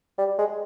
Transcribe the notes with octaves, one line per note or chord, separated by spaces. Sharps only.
G3
G#3